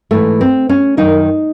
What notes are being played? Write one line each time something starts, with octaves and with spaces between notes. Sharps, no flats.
G#2 E3 A3
C4
C#4
F#2 D#3 D#4